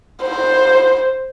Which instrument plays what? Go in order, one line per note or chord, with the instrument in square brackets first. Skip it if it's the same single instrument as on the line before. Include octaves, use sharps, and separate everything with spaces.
[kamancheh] C5